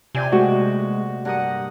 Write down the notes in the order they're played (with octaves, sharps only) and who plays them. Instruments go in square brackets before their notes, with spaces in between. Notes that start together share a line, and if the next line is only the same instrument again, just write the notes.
[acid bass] C3 [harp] F4 D5 G5 [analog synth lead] G#5
[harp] A#2 A3 [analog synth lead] G#3 [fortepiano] F#4
[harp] G2 A#4 D#6 [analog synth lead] F#5